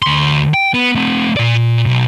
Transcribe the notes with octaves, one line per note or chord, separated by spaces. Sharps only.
D2 C6
G5
B3
A3 C4
A#2 D5
B1